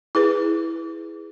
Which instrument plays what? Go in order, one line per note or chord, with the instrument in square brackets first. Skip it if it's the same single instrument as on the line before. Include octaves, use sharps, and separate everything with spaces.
[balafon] E4 G#4 B4